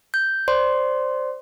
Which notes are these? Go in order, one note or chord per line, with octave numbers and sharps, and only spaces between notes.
G6
C5 D5 C6